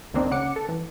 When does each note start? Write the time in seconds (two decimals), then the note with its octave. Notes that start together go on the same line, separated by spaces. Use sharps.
0.14 C#2 D#3 A#3 C4 D4 D#4
0.31 C#3 F#5 D6 C#7
0.56 A4
0.69 E3